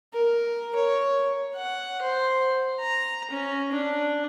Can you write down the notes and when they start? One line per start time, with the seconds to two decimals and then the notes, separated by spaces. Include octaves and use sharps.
0.13 A#4
0.76 C#5
1.56 F#5
2.02 C5
2.80 A#5
3.31 C#4
3.72 D4